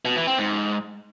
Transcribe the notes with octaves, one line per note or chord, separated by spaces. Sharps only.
B2
E3
C4
G#2